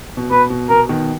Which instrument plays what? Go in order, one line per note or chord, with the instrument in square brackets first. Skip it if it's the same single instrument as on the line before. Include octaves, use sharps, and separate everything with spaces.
[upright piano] B2
[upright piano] B2 [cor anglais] B4
[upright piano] B2
[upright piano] B2 [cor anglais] A#4
[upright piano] B2 D#3